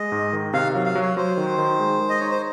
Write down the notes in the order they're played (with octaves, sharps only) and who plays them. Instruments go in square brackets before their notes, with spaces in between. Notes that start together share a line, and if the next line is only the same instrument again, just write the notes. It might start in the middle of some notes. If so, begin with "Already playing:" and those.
Already playing: [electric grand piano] G#3 [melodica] D#5
[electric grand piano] G#2
D#3
[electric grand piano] C3 [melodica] F5
[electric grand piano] F#3
[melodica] F5
[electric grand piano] F#3
[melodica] C#5
[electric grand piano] F#3 [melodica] C5
[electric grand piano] D#3
D#3
G#3
G#3
[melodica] D#5
[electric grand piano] D#4 [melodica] C#5
[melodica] C5